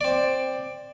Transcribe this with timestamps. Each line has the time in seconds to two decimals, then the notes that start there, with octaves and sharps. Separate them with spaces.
0.01 C4 D5